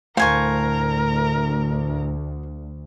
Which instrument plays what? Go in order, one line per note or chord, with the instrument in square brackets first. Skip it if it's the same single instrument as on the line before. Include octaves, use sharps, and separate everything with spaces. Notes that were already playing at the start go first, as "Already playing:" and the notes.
[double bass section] D2 [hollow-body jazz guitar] A2 F5 [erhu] A#4 [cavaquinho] C5 G#5 C#6